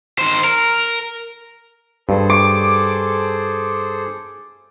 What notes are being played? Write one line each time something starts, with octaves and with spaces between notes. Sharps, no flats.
D#3 C5
A#4
G2 G#4 A4 C5
D6